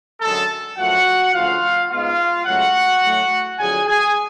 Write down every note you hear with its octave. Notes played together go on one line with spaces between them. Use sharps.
F#2 D3 G#3 A4 A5
F#2 F3 A3 F#4 F#5
D2 C#3 F3 F4 F5
G#2 G#3 B3 F4 F5
C#2 C#3 F#3 A3 F#4 F#5
A2 F#3 A3
F2 D3 F#3 G#4 G#5
G#4 G#5